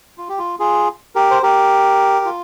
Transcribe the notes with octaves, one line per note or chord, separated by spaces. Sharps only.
F4
G4
F4
F4 G#4
G4 A#4
C5
G4 A#4
F4